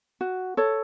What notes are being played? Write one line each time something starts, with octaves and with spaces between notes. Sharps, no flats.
F#4
A4 C#5